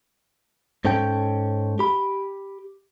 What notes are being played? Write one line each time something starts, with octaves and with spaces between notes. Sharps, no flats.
G#2 C#4 A4 C#5 G5
G4 B5